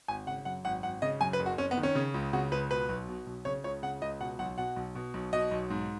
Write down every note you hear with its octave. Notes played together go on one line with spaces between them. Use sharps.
G#1 G#5
C#3 F#5
F#2 F#5
G#1 F#5
G#1 F#5
C#3 D#5
F#2 G#5
B4
F#1
F#4
F#1 C#4
B3
D#3
C#4
C#3
C#2
C#3 F#4
C#2 B4
B2 B4
B1
B2
B1
C#3 C#5
C#2 C#5
C#3 F#5
C#2 D#5
B2 F#5
B1 F#5
B2 F#5
B1
B2
B1
B2 D#5
B1
G#2